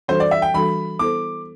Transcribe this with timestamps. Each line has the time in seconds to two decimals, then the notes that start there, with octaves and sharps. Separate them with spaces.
0.08 E3 G3 D4 F#4 A4 C5
0.20 D5
0.31 E5
0.42 G5
0.54 E3 G3 D4 F#4 A4 B5
0.99 B3 E4 A4 C5 D6